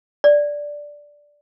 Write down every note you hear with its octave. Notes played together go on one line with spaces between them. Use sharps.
D5